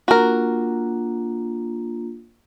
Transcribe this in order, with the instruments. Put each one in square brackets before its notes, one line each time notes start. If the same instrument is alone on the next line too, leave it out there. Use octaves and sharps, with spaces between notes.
[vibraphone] A#3 D4 F4 [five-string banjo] F#4 A#4